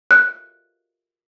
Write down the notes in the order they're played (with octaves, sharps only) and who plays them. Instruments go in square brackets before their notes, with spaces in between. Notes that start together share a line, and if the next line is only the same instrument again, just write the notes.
[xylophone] F#6